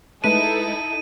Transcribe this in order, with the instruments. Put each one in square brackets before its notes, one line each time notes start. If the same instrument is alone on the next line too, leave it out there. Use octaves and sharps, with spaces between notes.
[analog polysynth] G#3 A3 B4 [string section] D#4 E4 A4 [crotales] D#7